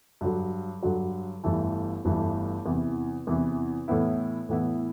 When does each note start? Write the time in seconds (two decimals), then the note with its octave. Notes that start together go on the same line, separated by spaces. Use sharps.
0.21 G2 D3 F#3
0.83 G2 D3 F#3
1.43 G1 G2 E3 A3
2.05 G1 G2 E3 A3
2.65 E2 C3 E3
3.27 E2 C3 E3
3.88 A2 E3 B3 E4
4.49 A2 E3 B3 E4